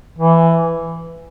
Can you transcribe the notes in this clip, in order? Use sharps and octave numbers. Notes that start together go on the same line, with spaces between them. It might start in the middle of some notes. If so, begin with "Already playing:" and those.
E3